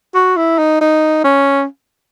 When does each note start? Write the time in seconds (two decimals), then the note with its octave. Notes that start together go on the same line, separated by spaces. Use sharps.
0.15 F#4
0.37 E4
0.58 D#4
0.81 D#4
1.24 C#4